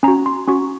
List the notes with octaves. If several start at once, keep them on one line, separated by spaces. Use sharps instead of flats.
C#4 F#4 A#5
C6
C#4 F#4 C#6